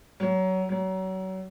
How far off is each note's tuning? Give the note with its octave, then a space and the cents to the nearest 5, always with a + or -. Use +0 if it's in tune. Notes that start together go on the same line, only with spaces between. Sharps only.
F#3 +20
F#3 +30